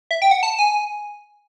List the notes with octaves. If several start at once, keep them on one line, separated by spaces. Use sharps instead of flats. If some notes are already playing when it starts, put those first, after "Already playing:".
E5
G5
F#5
A5
G#5